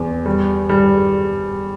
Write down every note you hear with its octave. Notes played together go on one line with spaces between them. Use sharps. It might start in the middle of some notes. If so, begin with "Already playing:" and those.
Already playing: E2
G3
G3